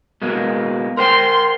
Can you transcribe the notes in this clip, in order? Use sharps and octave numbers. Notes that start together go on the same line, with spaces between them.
B2 G#3 A#3
A#4 C5 G5 C6